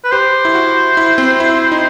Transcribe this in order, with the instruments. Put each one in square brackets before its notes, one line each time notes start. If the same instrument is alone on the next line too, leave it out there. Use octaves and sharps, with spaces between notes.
[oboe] B4
[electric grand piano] G4 [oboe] C5
[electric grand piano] E4
F#4
E4
C4
E4
D#4